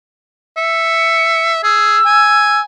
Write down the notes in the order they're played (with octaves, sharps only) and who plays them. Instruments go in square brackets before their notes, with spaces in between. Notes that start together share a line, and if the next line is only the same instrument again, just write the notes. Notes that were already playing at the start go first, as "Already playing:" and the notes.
[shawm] E5 [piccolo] C#7
[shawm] G#4 [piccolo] E6
[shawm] G#5